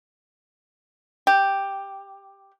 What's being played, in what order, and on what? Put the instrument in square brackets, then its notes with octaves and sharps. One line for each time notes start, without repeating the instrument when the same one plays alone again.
[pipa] G4